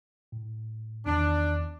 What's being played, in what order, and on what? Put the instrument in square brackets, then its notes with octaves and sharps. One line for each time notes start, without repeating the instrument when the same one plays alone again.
[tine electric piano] A2
[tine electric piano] E2 D#3 [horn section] D4